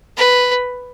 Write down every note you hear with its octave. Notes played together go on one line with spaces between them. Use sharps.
B4